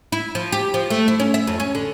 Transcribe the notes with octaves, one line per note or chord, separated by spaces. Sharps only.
E4
F3
G4
F3
A3
E4
C#4
E5
F2
C#4
D3